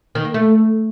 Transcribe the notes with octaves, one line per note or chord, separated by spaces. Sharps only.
D#3
A#3
A3